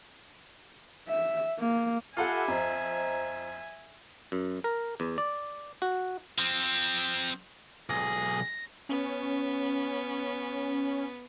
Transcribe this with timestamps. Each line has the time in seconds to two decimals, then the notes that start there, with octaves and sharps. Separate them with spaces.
1.08 E5
1.60 A#3
2.17 F4 G4 A4 E5 F#5 G#5 B5 D6
2.48 F2 C5 D#5 A#5
4.32 F#2
4.64 A#4
5.00 E2
5.18 D5
5.82 F#4
6.38 F3 C4
7.89 B1 G#4 A#6
8.89 B3 C#4